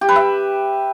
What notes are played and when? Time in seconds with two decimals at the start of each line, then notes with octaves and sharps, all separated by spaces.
0.01 G4
0.09 B4
0.16 E5